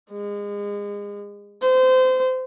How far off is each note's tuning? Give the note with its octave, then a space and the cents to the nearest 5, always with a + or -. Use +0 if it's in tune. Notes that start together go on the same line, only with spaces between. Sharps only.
G#3 -30
C5 -25